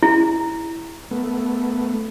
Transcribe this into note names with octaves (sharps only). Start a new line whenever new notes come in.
E4
A3 B3